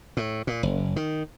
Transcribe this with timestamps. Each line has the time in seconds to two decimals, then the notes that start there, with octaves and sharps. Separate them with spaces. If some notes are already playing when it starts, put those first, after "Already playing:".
0.17 A2
0.47 A#2
0.63 F#1
0.96 D#3